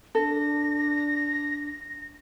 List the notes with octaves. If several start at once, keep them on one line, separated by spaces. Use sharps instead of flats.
D4 A4 A#6